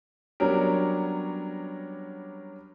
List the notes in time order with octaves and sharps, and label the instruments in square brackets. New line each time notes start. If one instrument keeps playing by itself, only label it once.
[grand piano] F#3 G3 B3 C#4 D4 A#4